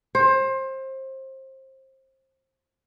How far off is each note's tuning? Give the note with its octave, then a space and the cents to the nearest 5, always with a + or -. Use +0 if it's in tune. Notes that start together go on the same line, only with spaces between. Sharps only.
C5 +25